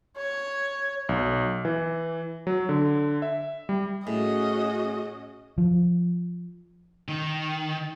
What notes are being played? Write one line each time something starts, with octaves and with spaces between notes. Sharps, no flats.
C#5
B1
E3
F#3
D3
E5
G3
A2 C#4 F#4 G#4 D#5
F3
D#3